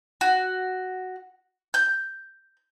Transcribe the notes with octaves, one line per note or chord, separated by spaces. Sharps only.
F#4
G6